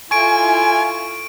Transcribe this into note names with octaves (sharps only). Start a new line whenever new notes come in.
E4 F4 A4 G#5 C#6 D7